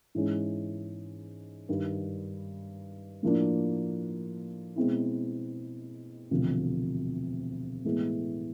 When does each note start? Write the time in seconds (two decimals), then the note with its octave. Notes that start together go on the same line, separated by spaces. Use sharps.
0.15 G#2 E3 G#3 C#4
1.69 G2 D#3 G3
3.23 A2 F3 A#3 D4
4.76 B2 G#3 C4 E4
6.31 E1 D2 C3 F3
7.85 A2 E3 G#3 B3